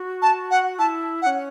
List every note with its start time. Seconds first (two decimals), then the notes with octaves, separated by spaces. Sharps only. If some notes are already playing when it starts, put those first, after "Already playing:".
Already playing: F#4
0.22 A5
0.51 F#5
0.79 E4 A5
1.22 E4 F#5
1.26 C#4